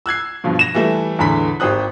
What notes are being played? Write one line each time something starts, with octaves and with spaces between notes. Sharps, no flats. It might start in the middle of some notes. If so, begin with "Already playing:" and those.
E6 F#6 G#6 C7
G2 B2 F3
A#6 E7
E3 G3 A3
E2 A2 D3 B5 B6
G#1 G4 C5 D#6 F#6